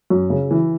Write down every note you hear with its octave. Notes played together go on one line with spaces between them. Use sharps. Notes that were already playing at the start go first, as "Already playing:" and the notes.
F#2
C#3
E3